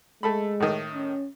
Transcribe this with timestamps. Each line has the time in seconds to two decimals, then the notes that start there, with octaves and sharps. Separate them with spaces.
0.23 G#3 A3 A4 B5
0.60 A2 D#3
0.94 C#4